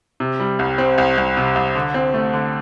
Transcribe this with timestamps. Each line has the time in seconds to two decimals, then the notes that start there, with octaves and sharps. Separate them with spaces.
0.20 C3
0.40 G3
0.59 C2
0.78 C4
0.98 C2
1.18 C2
1.37 C3
1.55 C2
1.75 D3
1.94 C4
2.14 A3
2.33 D3